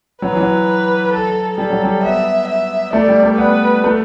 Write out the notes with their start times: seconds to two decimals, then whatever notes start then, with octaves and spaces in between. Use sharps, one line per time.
0.22 F#3 B4
0.31 E3
0.40 F#3
1.13 A4
1.58 G3 A4
1.70 F#3
1.83 G3
2.03 B3 E5
2.48 E5
2.93 A3 D5
3.08 G3
3.23 A3
3.38 B3 B4
3.84 A3